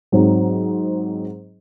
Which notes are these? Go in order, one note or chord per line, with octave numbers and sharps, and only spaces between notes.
G#2 F#3 C4 D#4